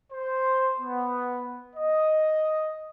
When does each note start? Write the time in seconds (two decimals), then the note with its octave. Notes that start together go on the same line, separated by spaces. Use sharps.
0.13 C5
0.80 B3
1.76 D#5